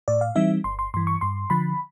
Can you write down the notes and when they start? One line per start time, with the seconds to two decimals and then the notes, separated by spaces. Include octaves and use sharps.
0.08 A2 D5
0.21 F5
0.35 E3 G3 C4 D#4 E5
0.64 G1 C6
0.79 C6
0.94 G2 E3 C6
1.07 C#6
1.21 G2 C6
1.50 D3 F3 B5